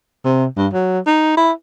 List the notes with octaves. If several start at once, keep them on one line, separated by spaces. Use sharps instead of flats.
C3
G2
F#3
D#4
E4